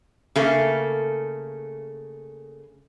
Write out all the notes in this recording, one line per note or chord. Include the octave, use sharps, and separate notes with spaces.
C#3 A3 A#3